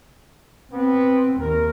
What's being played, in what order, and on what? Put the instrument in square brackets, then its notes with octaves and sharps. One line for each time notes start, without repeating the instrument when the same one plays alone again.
[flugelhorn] B3 [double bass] C4
[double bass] D#2 [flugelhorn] A#4